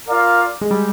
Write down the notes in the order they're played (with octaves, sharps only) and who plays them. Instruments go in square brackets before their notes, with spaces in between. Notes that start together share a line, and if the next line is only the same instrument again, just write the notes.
[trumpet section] F4 A#4 D5 F5
[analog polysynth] G#3
G3